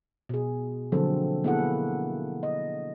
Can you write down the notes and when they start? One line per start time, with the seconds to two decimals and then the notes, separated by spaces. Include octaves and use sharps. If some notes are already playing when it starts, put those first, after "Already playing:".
0.29 B2 G#4
0.92 D3 F3 F#3 A#3 C4 A4
1.44 A#3 B3 E4 G#4 A4 F#5
2.43 D#5